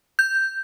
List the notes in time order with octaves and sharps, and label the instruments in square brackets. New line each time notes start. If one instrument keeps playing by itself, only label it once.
[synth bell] G6